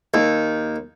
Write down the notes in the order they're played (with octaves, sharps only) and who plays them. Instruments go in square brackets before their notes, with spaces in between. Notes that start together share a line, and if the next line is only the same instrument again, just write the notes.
[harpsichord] D#2